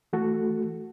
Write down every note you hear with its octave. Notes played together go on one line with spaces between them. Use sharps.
E3 A3 F#4 A4